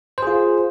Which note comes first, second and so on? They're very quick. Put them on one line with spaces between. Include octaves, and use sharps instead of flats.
C5 G#4 F4